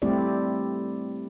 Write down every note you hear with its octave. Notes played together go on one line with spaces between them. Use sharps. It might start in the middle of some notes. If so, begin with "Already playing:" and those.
G3 A3 C4 E4 G4 D5